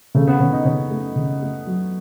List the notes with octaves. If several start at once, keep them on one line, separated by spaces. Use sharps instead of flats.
C#3 A3
B3
C#3 C#4
D#4
C#3 C#4
A3
C#3
A3
F#3